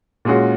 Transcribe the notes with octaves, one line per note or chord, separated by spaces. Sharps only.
A#2 G#3 C#4 F#4